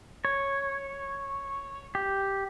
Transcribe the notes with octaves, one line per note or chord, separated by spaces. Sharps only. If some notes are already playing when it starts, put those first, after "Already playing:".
C#5
G4